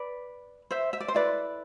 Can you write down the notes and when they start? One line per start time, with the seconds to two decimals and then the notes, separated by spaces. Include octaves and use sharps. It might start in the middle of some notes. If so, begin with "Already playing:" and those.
Already playing: B4 D5
0.71 C5 E5
0.93 E5
1.00 D5
1.08 C5
1.14 E4 A4 B4 D5